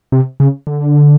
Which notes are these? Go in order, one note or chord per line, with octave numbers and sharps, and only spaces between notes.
C3
C#3
D3